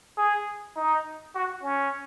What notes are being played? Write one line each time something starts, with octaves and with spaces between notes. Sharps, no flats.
G#4
D#4
F#4
C#4